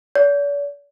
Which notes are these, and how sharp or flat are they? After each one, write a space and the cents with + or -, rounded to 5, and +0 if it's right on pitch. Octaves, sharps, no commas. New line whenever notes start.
D5 -45